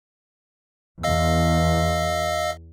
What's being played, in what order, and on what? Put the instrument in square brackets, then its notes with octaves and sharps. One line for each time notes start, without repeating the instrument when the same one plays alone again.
[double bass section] E2 [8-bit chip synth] D#5 F5 E6